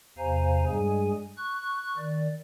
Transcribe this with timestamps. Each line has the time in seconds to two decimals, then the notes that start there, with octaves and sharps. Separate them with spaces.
0.18 E2 C3 C5 F5 G#5 A#5
0.67 G2 G3 G#3 G#4 G#5
1.37 C#6 F#6
1.97 D#3 D5